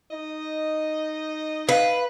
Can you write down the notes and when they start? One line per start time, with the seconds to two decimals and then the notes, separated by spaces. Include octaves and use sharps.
0.11 D#4 D#5
1.69 B4 F5